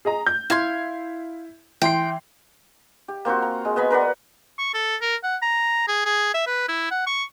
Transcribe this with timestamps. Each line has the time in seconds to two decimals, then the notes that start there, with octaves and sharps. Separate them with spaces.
0.05 G#4 D#5 A#5
0.27 G6
0.50 E4 F5 C6 G#6
1.82 E3 G5 C6 C7
3.08 G4
3.25 A#3 C4 F4 F#4
3.42 A#5
3.65 G#3
3.76 B3 D#5 G#5 B5
3.90 A#4 B4 D5 F#5
4.59 C#6
4.74 A4
5.02 A#4
5.23 F#5
5.42 A#5
5.88 G#4
6.05 G#4
6.34 E5
6.47 B4
6.68 E4
6.91 F#5
7.07 C#6